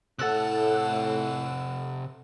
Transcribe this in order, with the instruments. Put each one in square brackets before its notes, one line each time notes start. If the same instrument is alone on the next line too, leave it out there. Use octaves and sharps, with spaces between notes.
[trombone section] A2 [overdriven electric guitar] C3 F#5 [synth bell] A4 E6 F#6